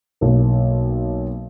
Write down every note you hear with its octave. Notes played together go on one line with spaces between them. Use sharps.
B1 A#3